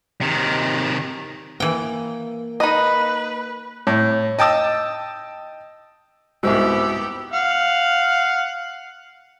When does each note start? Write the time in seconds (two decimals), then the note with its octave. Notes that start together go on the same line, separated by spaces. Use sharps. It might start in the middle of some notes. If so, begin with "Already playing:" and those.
0.21 C3 D#3
1.60 E3 A#3 G5
2.60 D#4 B4 D#5
3.87 A2
4.39 D#5 G5 A5 D#6 E6
6.43 C2 G#2 B3 F#4 G4 C5 E5 E6
7.33 F5 F#5